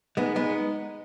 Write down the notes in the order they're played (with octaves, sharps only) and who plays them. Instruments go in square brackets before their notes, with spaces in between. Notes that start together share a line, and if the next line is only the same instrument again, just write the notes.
[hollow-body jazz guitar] G#3 B3 [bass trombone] D#4
[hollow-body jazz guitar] G#3 B3